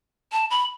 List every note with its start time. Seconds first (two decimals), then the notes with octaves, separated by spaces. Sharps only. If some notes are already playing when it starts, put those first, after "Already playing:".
0.32 A5
0.50 B5